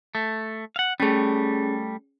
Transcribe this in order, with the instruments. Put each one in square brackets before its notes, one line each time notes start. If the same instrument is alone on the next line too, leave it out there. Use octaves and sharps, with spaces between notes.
[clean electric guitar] A3
F5 F#5
[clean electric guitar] G3 A3 [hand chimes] C#4 G#4